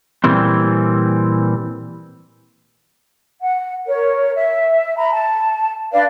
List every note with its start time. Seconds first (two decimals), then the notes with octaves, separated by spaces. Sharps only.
0.24 A#2 E3 G3 C4
3.43 F#5
3.86 A#4 C#5
4.36 E5
4.97 A#5 B5
5.12 A5
5.92 D4 B4 D5 F5